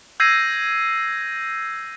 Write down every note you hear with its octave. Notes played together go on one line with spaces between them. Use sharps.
E6 G6 G#6 A#6 C7 D#7